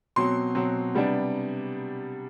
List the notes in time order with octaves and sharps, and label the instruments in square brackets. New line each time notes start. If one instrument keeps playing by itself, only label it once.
[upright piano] B2 F#3 C4 C6
B2 F#3 C4
C3 G3 B3 D4